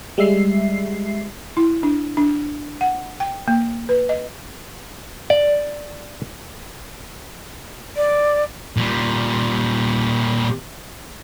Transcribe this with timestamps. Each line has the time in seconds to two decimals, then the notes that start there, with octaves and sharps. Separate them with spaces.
0.18 G3 G#3 E5 C7
1.57 E4
1.83 D4
2.17 D4
2.81 F#5
3.20 G5
3.48 A#3
3.89 B4
4.09 D#5
5.30 D5
7.96 D5
8.77 A#2 G3